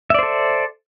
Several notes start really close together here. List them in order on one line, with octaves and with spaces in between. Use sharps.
E5 D5 C5 A4